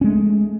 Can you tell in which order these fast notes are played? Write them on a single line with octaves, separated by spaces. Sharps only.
C#4 G#3 A3